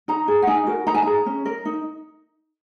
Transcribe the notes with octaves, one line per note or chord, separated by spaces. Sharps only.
D#4 A#5
G#4
F#5
D#4 G#5
F#4 A#4
D#4 A#5
G#5
G#4 A#5
C#4
A#4
D#4